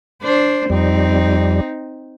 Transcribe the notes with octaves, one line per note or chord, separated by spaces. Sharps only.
D4 C5
F2 G3 C4 D#4